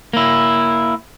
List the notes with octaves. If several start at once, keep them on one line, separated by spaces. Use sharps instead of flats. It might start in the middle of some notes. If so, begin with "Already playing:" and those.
A#3 E4